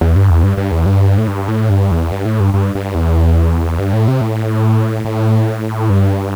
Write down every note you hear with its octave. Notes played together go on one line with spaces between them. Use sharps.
E2
G2
E2
G2
G2
E2
G2
A2
G2
A2
G2
E2
G2
A2
G2
G2
G2
E2
G2
A2
C3
A2
A2
G2